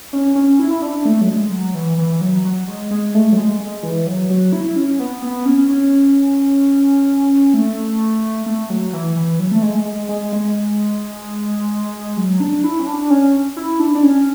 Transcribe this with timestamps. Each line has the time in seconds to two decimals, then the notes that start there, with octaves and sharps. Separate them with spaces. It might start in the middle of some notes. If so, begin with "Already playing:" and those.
0.13 C#4
0.35 C#4
0.59 E4
0.71 E4
0.82 D4
1.05 A3
1.21 F#3
1.28 G#3
1.51 F#3
1.74 E3
1.98 E3
2.21 F#3
2.45 F#3
2.68 G#3
2.91 G#3
3.14 A3
3.32 F#3
3.37 G#3
3.60 G#3
3.83 E3
4.07 F#3
4.30 F#3
4.53 E4
4.76 C#4
4.99 B3
5.22 B3
5.45 C#4
5.69 C#4
7.54 A3
8.46 A3
8.70 F#3
8.93 E3
9.16 E3
9.39 F#3
9.51 A3
9.62 G#3
9.86 G#3
10.09 G#3
10.32 G#3
12.17 F#3
12.40 D4
12.64 E4
12.79 C#4
12.87 D4
13.10 C#4
13.57 E4
13.79 D4
13.95 D4
14.03 C#4